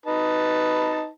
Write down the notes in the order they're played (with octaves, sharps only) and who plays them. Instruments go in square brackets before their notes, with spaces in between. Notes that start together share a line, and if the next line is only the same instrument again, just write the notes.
[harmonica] D#4 B4 A5